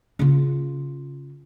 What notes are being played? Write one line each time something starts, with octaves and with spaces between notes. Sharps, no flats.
C#3 F4